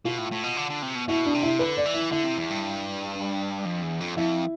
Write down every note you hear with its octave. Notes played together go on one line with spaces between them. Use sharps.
B2 F4
A2
A2
B2
D3
D3
C3
B2
B2 E4
D4
C3
E4
D3 B4
D5
E3
E4
D3 E4
C3
E2
G2
D4
F2
E2
F2
F2 E4